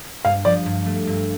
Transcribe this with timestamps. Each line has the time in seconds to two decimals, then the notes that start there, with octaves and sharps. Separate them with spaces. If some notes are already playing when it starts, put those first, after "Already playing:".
0.25 G2 F5
0.45 F3 D5
0.66 G2
0.86 A3
1.07 G2